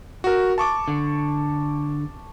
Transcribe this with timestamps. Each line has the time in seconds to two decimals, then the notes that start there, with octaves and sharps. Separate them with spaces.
0.24 F#4 A#4
0.58 A5 C#6 D6
0.88 D3